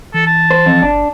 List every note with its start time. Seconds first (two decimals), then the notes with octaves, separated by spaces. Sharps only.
0.14 E3 A4
0.27 A5
0.51 C5
0.66 F2
0.82 G1 D4